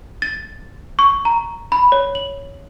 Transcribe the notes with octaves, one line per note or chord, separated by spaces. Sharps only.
A6
C#6
A#5
B5
C#5
F#7